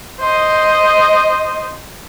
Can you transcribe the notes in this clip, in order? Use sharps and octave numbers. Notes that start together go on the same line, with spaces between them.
C5 D#5